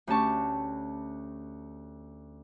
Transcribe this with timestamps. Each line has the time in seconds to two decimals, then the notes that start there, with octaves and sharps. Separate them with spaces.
0.07 D2 C#4 G4 A5 C#6